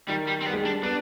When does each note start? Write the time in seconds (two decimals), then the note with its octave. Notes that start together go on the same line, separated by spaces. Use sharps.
0.09 D#3 G3
0.27 G3
0.41 C4
0.46 G3 B3
0.54 G#3
0.62 G3 D4
0.83 B3 D4